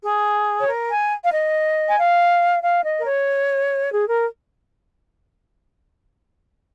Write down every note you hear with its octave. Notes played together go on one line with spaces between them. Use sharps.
G#4
C#5
A#4
G#5
F5
D#5
G#5
F5
F5
D#5
A#4
C#5
G#4
A#4